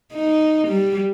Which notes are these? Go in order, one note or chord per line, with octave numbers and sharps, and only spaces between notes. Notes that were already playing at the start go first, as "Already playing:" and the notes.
D#4
G3